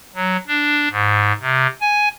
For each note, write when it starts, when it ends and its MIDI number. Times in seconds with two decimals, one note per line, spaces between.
0.15 0.37 54
0.47 0.88 62
0.91 1.32 44
1.41 1.67 48
1.81 2.09 80